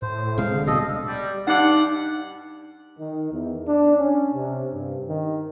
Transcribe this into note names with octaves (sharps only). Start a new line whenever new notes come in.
A2 C5
C3 G#3 F5
D3
D2 B2 G3 A4 D#5
G3
G2 D#4 F#5 D6
D#3
E2
D4
C#4
C3
G2
D#3